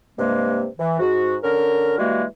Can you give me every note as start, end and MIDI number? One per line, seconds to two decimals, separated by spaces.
0.18 0.66 43
0.18 0.66 48
0.18 0.66 56
0.18 0.66 58
0.78 0.99 52
1.00 1.36 44
1.00 1.36 66
1.44 1.98 50
1.44 1.98 61
1.44 1.98 70
1.98 2.23 52
1.98 2.23 55
1.98 2.23 56
1.98 2.23 58
1.98 2.23 66